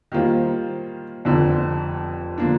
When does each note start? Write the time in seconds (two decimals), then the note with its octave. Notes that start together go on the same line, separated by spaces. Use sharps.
0.12 D#3 G3 A#3 F4 C5
1.25 F1 F2 D3
2.38 D3 F3 A#3 D4